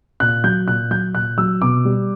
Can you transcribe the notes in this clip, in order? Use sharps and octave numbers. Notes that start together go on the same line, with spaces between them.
A#2 F#6
F#3 G6
A#2 F#6
F#3 G6
A#2 F#6
F#3 E6
B2 D6
G3